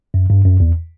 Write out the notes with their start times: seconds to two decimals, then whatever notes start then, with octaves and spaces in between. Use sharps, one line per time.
0.14 F#2
0.30 G2
0.45 F#2
0.60 E2